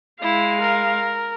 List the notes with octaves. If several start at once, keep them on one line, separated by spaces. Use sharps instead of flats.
G#3 E4 F5
A#4